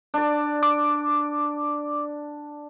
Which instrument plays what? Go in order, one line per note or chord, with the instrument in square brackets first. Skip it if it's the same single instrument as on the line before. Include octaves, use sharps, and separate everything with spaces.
[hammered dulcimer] D4 D5
[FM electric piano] D6